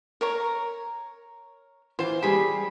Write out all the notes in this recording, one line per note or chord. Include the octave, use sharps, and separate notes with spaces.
A#4 C#5 A#5
E3 F4 C5
G3 G4 G#4 B5